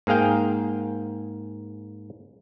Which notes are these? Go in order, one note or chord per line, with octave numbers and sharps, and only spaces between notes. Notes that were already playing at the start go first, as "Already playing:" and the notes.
G#2 A#3 G#4 F5 G5